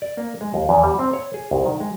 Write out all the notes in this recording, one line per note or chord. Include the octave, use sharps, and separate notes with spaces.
D5
A#3
G#3
D#2
E2
G3
C4
C#5
G#4
C2
D#3
G#3